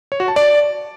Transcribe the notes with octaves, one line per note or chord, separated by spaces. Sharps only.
C#5
F#4
A5
D5